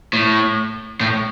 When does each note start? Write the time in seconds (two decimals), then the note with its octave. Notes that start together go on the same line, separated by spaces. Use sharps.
0.13 A2
1.00 A2